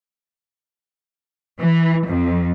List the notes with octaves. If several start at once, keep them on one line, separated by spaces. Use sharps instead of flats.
E3
F2